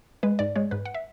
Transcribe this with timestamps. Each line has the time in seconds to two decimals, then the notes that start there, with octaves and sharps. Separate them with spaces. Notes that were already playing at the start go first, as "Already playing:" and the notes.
0.23 G#3 B4
0.39 G#2 D5
0.56 G#3 C#5
0.71 G#2 B4
0.85 F#5
0.94 E5